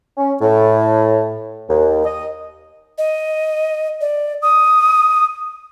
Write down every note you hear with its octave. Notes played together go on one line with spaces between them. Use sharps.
C#4
A2
D#2
D#5
D#5
D5
D#6